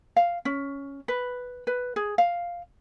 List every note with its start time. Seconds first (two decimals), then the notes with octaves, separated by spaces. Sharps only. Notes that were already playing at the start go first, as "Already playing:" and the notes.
0.16 F5
0.45 C#4
1.08 B4
1.67 B4
1.96 G#4
2.18 F5